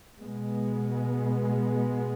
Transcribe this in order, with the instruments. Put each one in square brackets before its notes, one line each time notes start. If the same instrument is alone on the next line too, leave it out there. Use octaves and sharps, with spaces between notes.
[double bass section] B2 G#3 B3